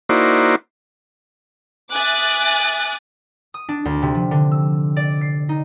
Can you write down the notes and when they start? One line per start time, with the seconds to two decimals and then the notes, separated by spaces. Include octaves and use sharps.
0.09 A#3 D#4 E4 F#4 C5 D5
1.94 E5 G#5 D6 D#6 F#6 A6
3.54 D#6
3.69 D4
3.85 D2
4.02 C3
4.14 F3
4.31 D3
4.52 E6
4.96 D5
5.21 C7
5.49 D#4